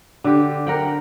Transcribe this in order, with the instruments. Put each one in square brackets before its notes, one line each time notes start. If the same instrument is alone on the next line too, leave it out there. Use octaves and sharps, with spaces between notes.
[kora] D3 G4
A#4 F#5 G5